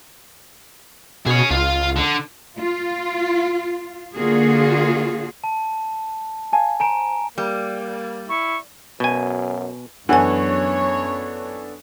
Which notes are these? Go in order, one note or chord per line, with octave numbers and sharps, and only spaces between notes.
B2 G#4 C#5
C#2 F4 F5
D3
F4
D3 A#3 F4 F#4 G#4
A5
F5 G#5 A5
C5 G#5 A#5 D7
G3 A#3
E4 C#6
F#2 B2 G#5
F#2 E3 B3 D4 A4 C#5 F#5 G#5